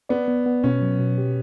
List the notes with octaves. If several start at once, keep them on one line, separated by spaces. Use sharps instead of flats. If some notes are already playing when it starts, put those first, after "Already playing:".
B3 D5
B3
B3
B2 C#4
F#3
B2
G4